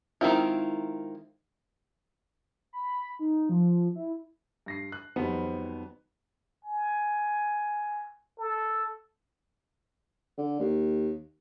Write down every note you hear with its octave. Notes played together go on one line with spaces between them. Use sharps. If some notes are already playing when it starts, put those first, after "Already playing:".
D#3 G#3 C4 E4 F4
B5
D#4
F3
E4
G2 A#6 C7
F#6
F2 D#3 F#3 G3 B3 C4
G#5
A4
D3
D#2